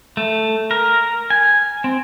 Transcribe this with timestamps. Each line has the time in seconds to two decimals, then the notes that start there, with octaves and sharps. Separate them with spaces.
0.17 A3
0.71 A#4
1.30 G#5
1.84 C4